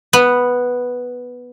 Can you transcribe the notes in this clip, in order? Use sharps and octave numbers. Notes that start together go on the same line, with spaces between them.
B3